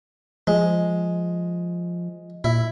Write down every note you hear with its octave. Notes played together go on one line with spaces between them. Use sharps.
F3 G#3
A#2 E4